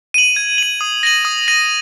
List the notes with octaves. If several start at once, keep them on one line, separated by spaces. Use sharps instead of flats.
D#7 F#7
G#6
D#7 F#7
D#6
A#6 D#7 F#7
D#6
A#6 D#7 F#7